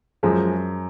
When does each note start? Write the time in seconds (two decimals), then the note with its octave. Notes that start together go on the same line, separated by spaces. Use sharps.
0.23 F#2 F3 G#3